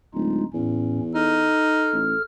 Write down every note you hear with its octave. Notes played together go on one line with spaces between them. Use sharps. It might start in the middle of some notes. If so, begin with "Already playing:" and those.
D1 G#3 D#4 F4
E2 A2 C#4
D#4 A4 F6
A1